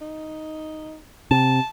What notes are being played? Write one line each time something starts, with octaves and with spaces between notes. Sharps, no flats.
D#4
C3 A5